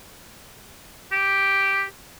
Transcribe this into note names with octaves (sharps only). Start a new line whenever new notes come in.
G4